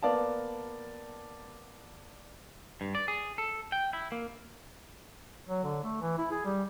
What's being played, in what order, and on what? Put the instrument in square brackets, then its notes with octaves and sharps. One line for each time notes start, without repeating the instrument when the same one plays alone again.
[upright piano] A#3 B3 D5 F5 A5
[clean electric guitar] G2
D5
G#4
A4
G5
E4
A#3
[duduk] F#3
D3
A3
E3
E4
G#4
G3